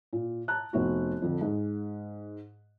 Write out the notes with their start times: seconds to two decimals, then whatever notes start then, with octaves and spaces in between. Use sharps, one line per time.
0.13 A#2
0.48 A5 A#5 F#6
0.73 F1 B3 F#4
1.22 F2 D3
1.41 G#2